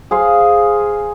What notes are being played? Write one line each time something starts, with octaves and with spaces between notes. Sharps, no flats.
G#4 C5 F5